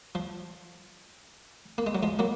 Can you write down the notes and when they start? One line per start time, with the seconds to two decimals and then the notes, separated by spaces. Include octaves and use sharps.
0.15 F3
1.78 A#3
1.87 G#3
1.95 F#3
2.03 F3 G#3
2.19 F#3 A#3